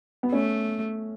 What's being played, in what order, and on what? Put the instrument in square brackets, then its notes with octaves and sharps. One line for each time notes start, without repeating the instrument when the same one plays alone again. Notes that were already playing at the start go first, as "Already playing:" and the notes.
[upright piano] B3
[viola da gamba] A3 [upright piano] C#4